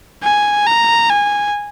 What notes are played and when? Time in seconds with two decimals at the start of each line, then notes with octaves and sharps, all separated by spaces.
0.23 G#5
0.67 A#5
1.10 G#5